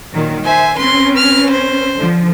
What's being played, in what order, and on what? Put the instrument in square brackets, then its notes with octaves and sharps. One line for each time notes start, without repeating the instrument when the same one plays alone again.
[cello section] A#2 D#3 F#3
[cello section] C5 E5 [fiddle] G#5
[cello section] C4 C#4 B4 [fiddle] C6
[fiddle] F6
C5
[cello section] D3 F3